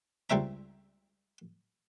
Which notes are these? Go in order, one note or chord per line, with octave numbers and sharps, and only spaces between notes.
C#2 G3 C4 E5 A#5